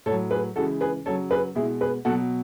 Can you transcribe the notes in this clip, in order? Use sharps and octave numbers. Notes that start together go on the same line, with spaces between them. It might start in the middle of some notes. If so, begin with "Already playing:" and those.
A2 F#3 A4 C#5
G#4 B4
C#3 E3 G#3 F#4 A4
G#4 B4
C#3 F#3 A4 C#5
G#4 B4
B2 G#3 E4 G#4
G#4 B4
B2 F#3 F#4 A4